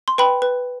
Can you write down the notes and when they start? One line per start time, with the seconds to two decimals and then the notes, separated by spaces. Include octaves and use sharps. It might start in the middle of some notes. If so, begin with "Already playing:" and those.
0.08 C6
0.18 B4 G5 B5
0.42 B4